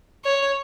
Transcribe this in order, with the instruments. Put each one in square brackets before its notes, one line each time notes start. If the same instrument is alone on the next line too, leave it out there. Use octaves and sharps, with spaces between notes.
[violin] C#5